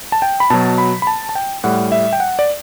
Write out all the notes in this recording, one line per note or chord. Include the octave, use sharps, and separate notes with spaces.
A5
G5
B5
B2 F#3 A5
B5
B5
A5
A5
G5
A2 G3 F#5
E5
G5
F#5
D5